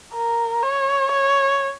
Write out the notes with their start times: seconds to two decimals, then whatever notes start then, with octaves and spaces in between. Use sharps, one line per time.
0.14 A#4
0.63 C#5
1.12 C#5